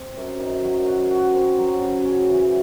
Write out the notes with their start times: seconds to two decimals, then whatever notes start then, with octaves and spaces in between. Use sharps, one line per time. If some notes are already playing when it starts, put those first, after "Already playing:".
Already playing: C4
0.17 F#2
0.40 D#3
0.64 F#3
0.87 F#4
1.11 F#4
1.34 C4
1.59 F#3
1.81 C#3
2.05 C#4
2.29 E3